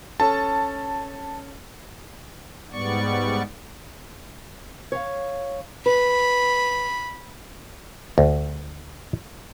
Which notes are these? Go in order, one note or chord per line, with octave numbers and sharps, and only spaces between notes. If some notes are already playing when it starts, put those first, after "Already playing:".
C#4 A4 A5
G#2 G3 B3 D5 C#6
C#5 F5
B4 B5
D2